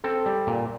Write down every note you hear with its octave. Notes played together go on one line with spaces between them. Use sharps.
C4 A4
G3
A#2